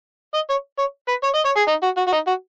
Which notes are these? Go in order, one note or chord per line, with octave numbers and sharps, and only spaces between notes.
D#5
C#5
C#5
B4
C#5
D#5
C#5
G#4
D#4
F#4
F#4
F#4
D#4
F#4